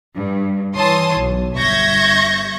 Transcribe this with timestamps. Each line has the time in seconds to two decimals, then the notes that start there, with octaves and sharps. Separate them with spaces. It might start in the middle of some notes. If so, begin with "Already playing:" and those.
0.14 G2
0.74 E3 C#5 A5 C6 D#6
1.15 B1
1.55 G1 E5 C#6 G6 G#6 A#6